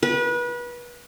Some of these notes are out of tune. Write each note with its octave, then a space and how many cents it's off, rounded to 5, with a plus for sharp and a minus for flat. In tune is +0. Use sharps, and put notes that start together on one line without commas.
B4 -30